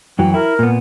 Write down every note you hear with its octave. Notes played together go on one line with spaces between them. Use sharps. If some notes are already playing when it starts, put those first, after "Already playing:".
F#2 E3 F#3 G5
E4 A#4
A#2 B3